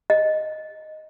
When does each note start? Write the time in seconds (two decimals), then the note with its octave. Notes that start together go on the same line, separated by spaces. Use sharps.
0.10 D#5